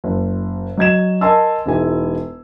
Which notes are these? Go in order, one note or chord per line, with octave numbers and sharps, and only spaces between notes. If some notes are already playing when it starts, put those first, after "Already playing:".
F#1
F#3 D#5 G#6 E7
A#4 D#5 G#5 A5 C6 E6
E1 G#3 D#4 E4 G#5